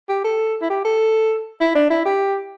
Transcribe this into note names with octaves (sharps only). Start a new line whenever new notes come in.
G4
A4
E4
G4
A4
E4
D4
E4
G4